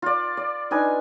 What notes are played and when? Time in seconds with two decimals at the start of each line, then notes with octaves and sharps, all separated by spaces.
0.02 F4 D5
0.37 D5
0.71 D4 D#4 B4 G#5